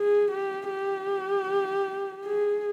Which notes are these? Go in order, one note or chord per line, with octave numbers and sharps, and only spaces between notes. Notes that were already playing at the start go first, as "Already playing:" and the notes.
Already playing: G#4
G4
G4
G#4